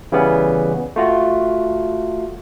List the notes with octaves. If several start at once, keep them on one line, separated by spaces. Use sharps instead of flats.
C#3 E3 G3 B3 C#4
A3 F4 F#4